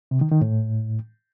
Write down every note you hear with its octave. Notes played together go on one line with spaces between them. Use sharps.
C3
D#3
D#3
A2